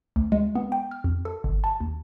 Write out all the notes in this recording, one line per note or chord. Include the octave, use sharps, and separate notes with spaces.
D2
G#3
B3
G5
F6
F2
A4
G1
A5
D#2